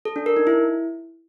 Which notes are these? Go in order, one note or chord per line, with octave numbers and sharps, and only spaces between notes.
A4
D4
A#4
D#4
E4